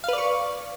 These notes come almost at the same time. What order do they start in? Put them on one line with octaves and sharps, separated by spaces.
F5 B4 D5 C#6